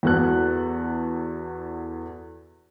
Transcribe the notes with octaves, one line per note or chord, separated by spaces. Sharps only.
E2 F#4 A4 F#6